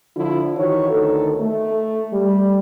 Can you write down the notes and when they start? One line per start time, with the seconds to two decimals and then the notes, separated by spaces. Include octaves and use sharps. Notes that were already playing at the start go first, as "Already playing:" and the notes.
0.16 D3 F3 E4 F4
0.56 D#3 E3 F#4 C#5
0.91 D2 D#3 A4
1.39 A3
2.12 G3